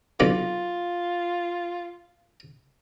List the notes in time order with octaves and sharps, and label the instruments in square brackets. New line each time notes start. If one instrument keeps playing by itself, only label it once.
[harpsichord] B1 D3 D6 [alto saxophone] F4